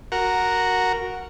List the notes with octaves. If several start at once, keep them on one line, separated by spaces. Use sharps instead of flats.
F#4 A#4